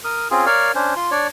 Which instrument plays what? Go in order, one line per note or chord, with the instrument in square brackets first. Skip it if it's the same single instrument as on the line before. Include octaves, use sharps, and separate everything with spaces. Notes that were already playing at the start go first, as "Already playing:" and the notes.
[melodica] A#4 D#6
C4 C#4 F4 G#4
A#4 C#5 D5 F5
C#4 D4 C5
F4 C6
D4 C#5 D5